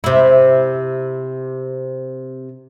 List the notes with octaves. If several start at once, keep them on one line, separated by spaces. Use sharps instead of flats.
C3 E4